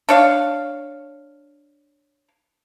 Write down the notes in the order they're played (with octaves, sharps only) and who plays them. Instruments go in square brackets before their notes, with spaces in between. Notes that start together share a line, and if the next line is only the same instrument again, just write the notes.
[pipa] D4 C#5 F5